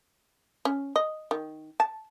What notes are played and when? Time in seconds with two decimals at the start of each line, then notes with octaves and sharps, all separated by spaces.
0.65 C#4
0.96 D#5
1.31 D#3
1.80 A5